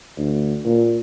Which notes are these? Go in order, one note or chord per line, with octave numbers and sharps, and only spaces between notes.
D2
A#2